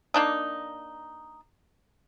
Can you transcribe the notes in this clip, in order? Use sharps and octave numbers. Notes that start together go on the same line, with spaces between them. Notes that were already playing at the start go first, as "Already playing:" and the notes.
A#3 D4 D#4